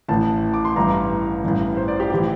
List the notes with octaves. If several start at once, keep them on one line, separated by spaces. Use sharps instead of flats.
A1 A2 E3 A5
D6
C6
A1 G2 E3 A#5
A1 G2 E3
C5
D5
G4
A2 E3 G4